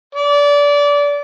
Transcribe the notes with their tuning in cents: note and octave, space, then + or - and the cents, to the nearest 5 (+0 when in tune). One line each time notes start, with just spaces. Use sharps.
D5 -25